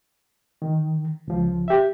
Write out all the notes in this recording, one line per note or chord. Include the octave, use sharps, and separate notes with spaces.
D#3
C#2 F3
G4 E5